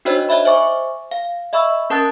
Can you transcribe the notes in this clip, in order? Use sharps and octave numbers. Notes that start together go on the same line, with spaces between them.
D4 D#4 F#4 C5 C#5 D#5
C#5 D#5 E5 B5
C5 E5 G#5 C#6 D6
F5
D#5 E5 B5 C#6 E6
C#4 A#4 A5 D#6 F#6 A6